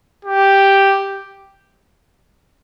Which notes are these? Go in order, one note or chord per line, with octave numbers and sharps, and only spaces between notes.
G4